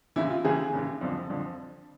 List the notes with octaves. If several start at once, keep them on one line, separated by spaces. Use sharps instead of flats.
D#2 C#3 E3 E4
F4
D#2 C#3 E3 G#4
D#2 C#3 E3
F2 D3 F3
F2 D3 F3